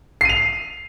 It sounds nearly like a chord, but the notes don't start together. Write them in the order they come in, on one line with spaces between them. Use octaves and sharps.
C7 D#7 F7